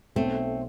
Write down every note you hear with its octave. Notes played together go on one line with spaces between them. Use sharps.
B1 A3 C4